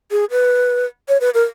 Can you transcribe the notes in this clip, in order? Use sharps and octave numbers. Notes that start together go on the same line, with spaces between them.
G#4
B4
C#5
B4
A#4